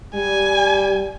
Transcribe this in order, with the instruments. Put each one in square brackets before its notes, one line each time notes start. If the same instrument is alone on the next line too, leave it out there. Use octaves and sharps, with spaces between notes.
[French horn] G3 [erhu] G#5